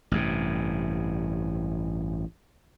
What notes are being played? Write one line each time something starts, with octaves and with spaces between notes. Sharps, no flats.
A1 G2 C3